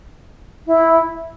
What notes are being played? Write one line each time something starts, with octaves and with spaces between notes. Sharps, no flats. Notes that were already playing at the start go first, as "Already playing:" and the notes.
E4